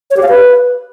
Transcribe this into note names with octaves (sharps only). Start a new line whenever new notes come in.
C#5
G4
F5
B4